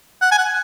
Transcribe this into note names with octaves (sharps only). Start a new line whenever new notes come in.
F#5
G#5
F#5